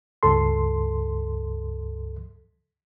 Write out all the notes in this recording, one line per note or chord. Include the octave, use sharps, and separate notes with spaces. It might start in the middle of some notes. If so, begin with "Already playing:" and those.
C#2 G2 A4 C6